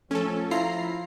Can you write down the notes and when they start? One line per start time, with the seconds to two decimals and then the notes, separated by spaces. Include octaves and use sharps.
0.11 F3 A3 C#4 A4
0.51 E4 F4 A#5 C7